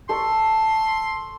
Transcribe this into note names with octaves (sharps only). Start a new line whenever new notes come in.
A4 C6 C#6